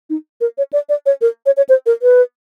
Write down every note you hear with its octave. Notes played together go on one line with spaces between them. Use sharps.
D#4
A#4
C#5
D5
D5
C#5
A#4
C#5
C#5
C5
A#4
B4